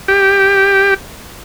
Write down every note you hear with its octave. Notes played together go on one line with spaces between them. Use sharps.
G4